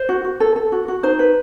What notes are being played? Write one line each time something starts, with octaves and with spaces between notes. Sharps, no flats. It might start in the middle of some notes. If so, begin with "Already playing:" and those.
Already playing: C5
F#4
F#4
A4
A4
F#4
F#4
D#4 C5
B4